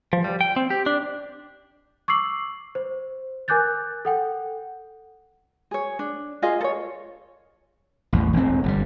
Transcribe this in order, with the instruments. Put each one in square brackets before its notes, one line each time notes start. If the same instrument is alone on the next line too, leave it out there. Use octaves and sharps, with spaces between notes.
[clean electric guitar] F3
G3
G5
C4
G4
D4
[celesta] C#6 D6 E6 C7 F#7
C5
A#4 G#5 D6 F#6 G6 A6
A4 F#5 G5
[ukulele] G#4 C#5
D4
F4 G#4 D#5 F5
A4 C#5
[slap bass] A1 E2
E1 C4
G1 C#3 G3